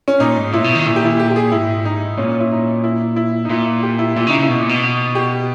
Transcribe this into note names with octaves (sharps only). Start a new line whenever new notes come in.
C#4
A#2 D#4
G#2
A#2 E4
B2
D#3
A#2 E4
G4
E4
G4
G4
G#4
G#2 E4
D#4
A#2 C#4
E4
D#4
E4
E4
D#4
A#2 E4
G4
E4
A#2 E4
C#3 D#4
C#3 E4
B2
A#2
B2
G4